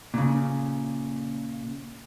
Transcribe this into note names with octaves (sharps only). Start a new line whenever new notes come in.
A#2 C#3